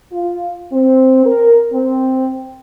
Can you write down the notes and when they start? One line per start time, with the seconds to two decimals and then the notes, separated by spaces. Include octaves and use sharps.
0.12 F4
0.72 C4
1.26 A#4
1.72 C4